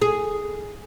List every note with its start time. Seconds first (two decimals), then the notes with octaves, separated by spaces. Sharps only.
0.02 G#4